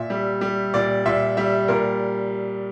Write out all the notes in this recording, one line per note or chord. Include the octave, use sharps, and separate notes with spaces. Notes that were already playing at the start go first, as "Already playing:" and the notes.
Already playing: A#2 E5
G3
G3
A#2 D5
A#2 E5
G3 E5
A#2 A#4